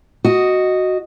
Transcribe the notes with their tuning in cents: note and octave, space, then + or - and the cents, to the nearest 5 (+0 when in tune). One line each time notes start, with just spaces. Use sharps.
F#4 +0 D#5 +0